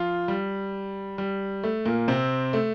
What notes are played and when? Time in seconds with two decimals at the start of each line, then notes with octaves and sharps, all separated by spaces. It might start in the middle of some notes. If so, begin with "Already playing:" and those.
Already playing: F3 F4
0.28 G3
1.18 G3
1.64 A3
1.85 A#2 A#3
2.08 C3 C4
2.53 A3